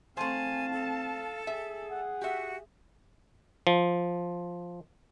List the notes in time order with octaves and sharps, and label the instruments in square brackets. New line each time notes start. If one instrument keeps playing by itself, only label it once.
[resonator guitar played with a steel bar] A3 C5 [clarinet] C4 [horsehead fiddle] F5 A5 [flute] G#5
[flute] A4
[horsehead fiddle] G#4 [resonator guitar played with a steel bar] E5
[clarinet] F#5
[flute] F#4 [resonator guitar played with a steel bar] G4 E5
[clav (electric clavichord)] F3